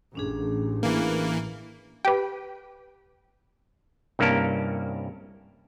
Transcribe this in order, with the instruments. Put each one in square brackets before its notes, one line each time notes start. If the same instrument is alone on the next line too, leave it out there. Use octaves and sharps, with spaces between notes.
[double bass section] A1 [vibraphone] C#4 D4 G#4
[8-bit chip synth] E3 A#3
[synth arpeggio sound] G4 B4
[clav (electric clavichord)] C2 G2 A#3 C#4 A#4 A5